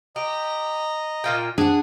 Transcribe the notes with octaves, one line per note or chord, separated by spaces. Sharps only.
G4 D#5 A#5
A#2 F4 G5
D4 G#4 F#5